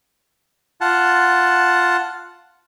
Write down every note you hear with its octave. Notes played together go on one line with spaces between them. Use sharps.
F4 F#5 A5